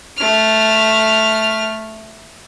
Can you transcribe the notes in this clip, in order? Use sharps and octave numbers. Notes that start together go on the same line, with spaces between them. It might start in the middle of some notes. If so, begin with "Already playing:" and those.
A3 F6